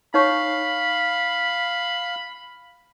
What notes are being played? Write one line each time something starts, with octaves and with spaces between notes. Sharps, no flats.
D#4 C#5 F5 B5 C#6